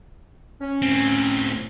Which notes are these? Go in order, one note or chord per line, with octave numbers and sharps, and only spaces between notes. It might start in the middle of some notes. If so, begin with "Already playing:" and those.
C#4
A2 C4